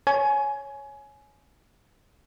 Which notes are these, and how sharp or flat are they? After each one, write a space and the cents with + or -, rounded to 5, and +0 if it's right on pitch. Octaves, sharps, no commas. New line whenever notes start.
C#5 +0 G#5 +20